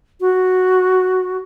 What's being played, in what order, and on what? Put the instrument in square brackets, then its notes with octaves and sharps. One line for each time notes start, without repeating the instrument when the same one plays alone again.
[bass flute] F#4